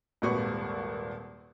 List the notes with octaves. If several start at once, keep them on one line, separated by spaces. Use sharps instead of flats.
D#1 G#1 A#2 F#4 B4 C#6